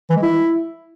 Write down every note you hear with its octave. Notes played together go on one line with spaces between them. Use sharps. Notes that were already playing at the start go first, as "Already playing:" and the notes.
E3
G#3
E4